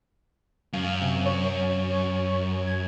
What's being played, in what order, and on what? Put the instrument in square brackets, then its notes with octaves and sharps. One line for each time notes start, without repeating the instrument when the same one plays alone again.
[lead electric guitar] F#2 [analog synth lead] F5
[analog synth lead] C3
C#5
G#6